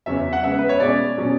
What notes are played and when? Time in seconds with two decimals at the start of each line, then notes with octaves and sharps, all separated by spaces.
0.06 E2 C#3 F#3 C#4 E5
0.33 F#5
0.43 C#3 G#3 B3 E5
0.58 B4
0.69 C#5
0.80 B2 G#3 C#4 D5
1.17 B2 F#3 C#4